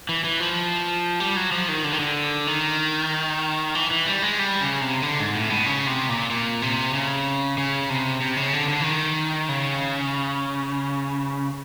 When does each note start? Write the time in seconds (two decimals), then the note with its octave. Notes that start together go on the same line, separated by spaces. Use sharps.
0.09 E3
0.24 E3
0.40 F3
1.20 G3
1.36 F#3
1.52 F3
1.69 D#3
1.84 D3
1.93 D#3
2.00 D3
2.47 D#3
3.75 E3
3.91 E3
4.07 G3
4.22 G#3
4.39 G3
4.60 C#3
4.81 C3
5.02 D3
5.19 G#2
5.35 A2
5.50 B2
5.66 C#3
5.87 C3
6.09 A#2
6.30 A#2
6.62 C3
6.94 C#3
7.58 C#3
7.90 C3
8.21 C3
8.37 C#3
8.53 D3
8.68 D3
8.81 E3
8.84 D#3
9.49 C#3